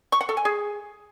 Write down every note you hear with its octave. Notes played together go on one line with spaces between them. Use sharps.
C#6
F#5
A4
G#5
G#4